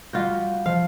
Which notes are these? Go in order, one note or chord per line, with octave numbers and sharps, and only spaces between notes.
G3 F4 F#4 G6
F3 F5